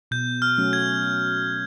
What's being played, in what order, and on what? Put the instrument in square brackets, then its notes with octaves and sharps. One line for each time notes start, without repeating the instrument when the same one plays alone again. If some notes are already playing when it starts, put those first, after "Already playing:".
[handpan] B2 [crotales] G6
[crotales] F6
[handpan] F#3 A3 C#4 F#4
[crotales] G#6